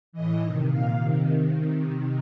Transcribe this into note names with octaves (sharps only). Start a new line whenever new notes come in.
A2 E3 D#5
C3 D#3
A#2 F5
C3 D#3